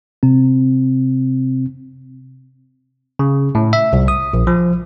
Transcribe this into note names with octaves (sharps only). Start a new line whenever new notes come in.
C3 C4
C#3
A2
E5
C2
D#6
A#1
F3